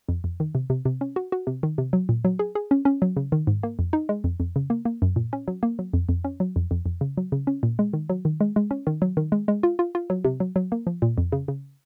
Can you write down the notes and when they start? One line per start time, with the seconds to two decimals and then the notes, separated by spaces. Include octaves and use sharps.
0.08 F2
0.24 F2
0.40 D#3
0.55 C3
0.70 C3
0.85 C3
1.01 C#4
1.16 F#4
1.32 F#4
1.47 C3
1.63 D#3
1.78 C3
1.93 F#3
2.09 A#2
2.25 F#3
2.39 G#4
2.55 G#4
2.71 C#4
2.85 C#4
3.02 F#3
3.17 C#3
3.32 D#3
3.47 G#2
3.63 A#3
3.79 F2
3.93 D#4
4.09 G#3
4.24 F2
4.40 F2
4.56 C#3
4.70 A#3
4.85 A#3
5.02 F#2
5.16 A#2
5.33 C#4
5.48 F#3
5.63 A#3
5.79 F#3
5.94 F2
6.09 F2
6.24 C#4
6.40 F#3
6.56 F2
6.71 F2
6.86 F2
7.01 C#3
7.17 F#3
7.32 C#3
7.47 C#4
7.63 A#2
7.79 G#3
7.94 D#3
8.09 F#3
8.25 D#3
8.41 G#3
8.56 G#3
8.71 C#4
8.87 D#3
9.02 F#3
9.17 D#3
9.32 G#3
9.48 G#3
9.63 F4
9.79 F4
9.95 F4
10.10 F#3
10.25 C3
10.40 F#3
10.56 F#3
10.72 A#3
10.87 F3
11.02 A#2
11.18 F2
11.32 C#3
11.48 C#3